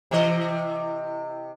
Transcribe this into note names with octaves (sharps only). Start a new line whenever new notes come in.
C3 E3 D#5